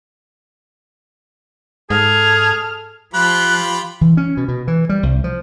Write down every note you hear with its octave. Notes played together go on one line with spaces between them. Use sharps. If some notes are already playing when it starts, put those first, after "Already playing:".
G#2 G#4 A4 F6
F3 F4 G4 B5 F#6
E3
C#4
B2
B2
E3
G3
C2
F3